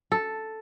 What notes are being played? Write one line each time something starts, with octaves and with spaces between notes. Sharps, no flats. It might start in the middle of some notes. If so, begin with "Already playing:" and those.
A4